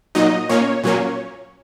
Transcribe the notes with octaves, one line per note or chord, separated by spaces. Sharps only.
A#2 F#3 D#4 D#5
A#2 A#3 C#4 C#5
A#2 F#3 A#3 C#4